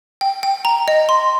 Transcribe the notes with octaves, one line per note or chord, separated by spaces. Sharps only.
G5
G5
A#5
D#5
C6